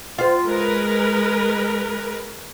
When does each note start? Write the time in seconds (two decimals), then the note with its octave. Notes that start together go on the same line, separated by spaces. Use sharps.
0.18 F4 C5
0.47 G#3 A#4 B4